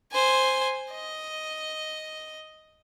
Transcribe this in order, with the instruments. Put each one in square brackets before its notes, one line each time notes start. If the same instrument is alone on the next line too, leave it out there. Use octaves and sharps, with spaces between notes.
[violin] C5 G#5
D#5